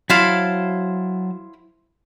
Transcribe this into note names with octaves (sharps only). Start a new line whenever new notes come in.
F#3 E4 C5 F5 A5